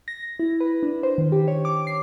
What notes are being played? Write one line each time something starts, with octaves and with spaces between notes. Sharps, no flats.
A#6
E4
B4
D4
C5
D#3
G4
C#5
D6
C7